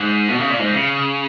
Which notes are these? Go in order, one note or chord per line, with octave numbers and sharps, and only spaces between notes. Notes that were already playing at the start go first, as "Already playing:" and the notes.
Already playing: G#2
B2
C#3
A#2
G#2
C#3